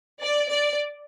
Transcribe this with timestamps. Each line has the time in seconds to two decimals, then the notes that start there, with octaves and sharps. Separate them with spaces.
0.22 D5
0.49 D5